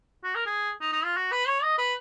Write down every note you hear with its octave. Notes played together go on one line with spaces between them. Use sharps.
F#4
A#4
G#4
D#4
D#4
F4
F#4
B4
C#5
D#5
B4